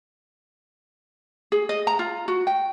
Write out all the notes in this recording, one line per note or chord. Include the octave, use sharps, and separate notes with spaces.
G#4
D#5
A#5
F4
F#4
G5